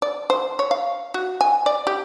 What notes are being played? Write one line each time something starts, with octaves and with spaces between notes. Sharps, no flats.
D5
C5
C#5
F5
F#4
G#5
D5
G4